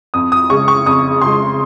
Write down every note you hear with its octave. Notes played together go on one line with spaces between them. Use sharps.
F2 D#6
D#6
C#3 G#3 C#6
C#6
F2 D#6
C#3 G#3 C6